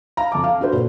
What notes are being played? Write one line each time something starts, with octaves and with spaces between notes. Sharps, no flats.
F5 A#5
F2 A5 D6
F5
D4 F#4 A4 B4 C5
A#2